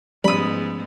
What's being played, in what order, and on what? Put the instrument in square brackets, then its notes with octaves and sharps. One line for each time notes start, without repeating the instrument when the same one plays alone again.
[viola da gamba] G#2 B3 [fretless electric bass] F3 A3 C#4 [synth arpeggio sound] G3 [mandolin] B5 D#6